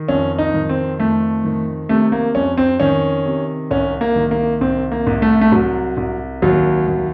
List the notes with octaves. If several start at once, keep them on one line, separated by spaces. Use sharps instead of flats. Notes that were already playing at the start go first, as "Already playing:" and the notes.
Already playing: D#3
F2 C#4
D#4
D#3
C4
F2 A3
D#3
C3 A3
A#3
F2 C#4
C4
D#3 C#4
C3
C2 C#4
A#3
D#3
A#3
C2 C4
A#3
C2
A3
A3
C2 F#3
C2
D#2 F#3
D#2